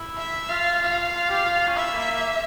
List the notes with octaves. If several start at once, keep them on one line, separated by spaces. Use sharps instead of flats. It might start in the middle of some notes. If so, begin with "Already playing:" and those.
Already playing: E4
E5
F4 F5
F5
F4
G4
F4
C#4
E4 E5
A#3